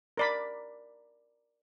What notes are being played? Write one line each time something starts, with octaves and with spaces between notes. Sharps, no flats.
A#4 D5 B5